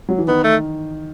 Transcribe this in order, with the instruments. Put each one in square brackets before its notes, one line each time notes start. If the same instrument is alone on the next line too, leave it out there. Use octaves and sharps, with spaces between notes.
[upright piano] F#3
E3
[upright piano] D#3 [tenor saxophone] B3
[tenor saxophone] A3